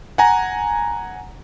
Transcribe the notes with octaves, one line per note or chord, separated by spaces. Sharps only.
F#5 G#5 A#5